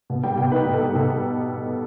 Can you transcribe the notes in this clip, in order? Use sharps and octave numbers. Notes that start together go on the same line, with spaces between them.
B2
G3 G5
B2 G5
D#4 B4
B2
A4
G3
B2 A4